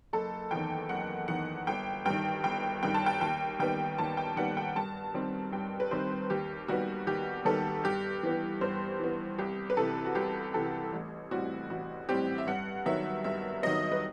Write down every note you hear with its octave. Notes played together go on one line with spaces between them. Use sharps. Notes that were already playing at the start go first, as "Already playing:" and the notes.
F#1 A4
E2 D#3 G5
F#1 F#5
E2 D#3 F#5
G1 G5
G2 D#3 G5
G1 G5
G2 D#3 G5
A5
G5
D#2 G5
D#3 G3 B3 G5
D#2 A5
G5
D#3 G3 B3 F#5
G5
G2 A5
D#3 G3 C4
G2 G5
B4
D#3 G3 C4 C5
D#2 G4
D#3 G3 B3 F#4
D#2 G4
D#3 G3 B3 A4
G2 G4
E3 B3
G2 C5
E3 B3
C2 G4
B4
C3 E3 A4
F#4
C2 G4
C3 E3 A4
A1
A2 G3 C4 F#4
A1 F#4
A2 G3 C4 G4
E5
G2 F#5
D#3 F#3 B3 E5
G2 E5
D#3 F#3 B3 D#5
B4